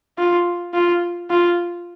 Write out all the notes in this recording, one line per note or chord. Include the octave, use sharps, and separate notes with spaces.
F4
F4
F4